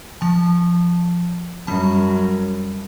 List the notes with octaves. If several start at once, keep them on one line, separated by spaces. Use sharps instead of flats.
F3 A5
F#2 G3 A5